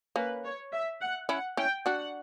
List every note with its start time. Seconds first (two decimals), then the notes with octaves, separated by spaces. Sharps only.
0.16 A#3 C#4 B4
0.44 C#5
0.73 E5
1.01 F#5
1.29 C#4 E4 F#5
1.57 C#4 E4 G5
1.86 D4 F#4 F#5